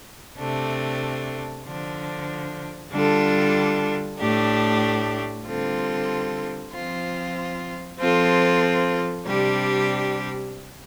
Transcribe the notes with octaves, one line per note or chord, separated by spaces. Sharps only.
C3 A3 D4
D3 F3 D4
D3 G3 D4 F4 A4
A2 A3 D4 G4
D3 G3 C4 F4 A4
F3 C4 F4
F3 C4 F4 A4
C3 G3 D4 G4